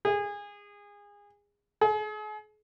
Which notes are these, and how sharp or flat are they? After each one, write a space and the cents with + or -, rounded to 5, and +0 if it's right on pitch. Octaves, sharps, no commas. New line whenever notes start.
G#4 -25
G#4 +40